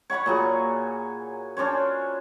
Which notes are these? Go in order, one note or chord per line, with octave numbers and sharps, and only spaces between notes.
C#5 F#5 B5 C#6
A#2 F#3 G#4
C#4 D4 C5 C#5